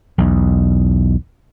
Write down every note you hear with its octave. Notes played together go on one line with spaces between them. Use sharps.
B1 E2